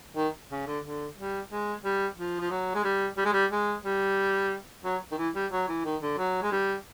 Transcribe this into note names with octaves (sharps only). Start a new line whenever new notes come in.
D#3
C#3
D3
D3
G3
G#3
G3
F3
F3
F#3
G#3
G3
G3
G#3
G3
G#3
G3
F#3
D#3
E3
G3
F#3
E3
D#3
D3
F#3
G#3
G3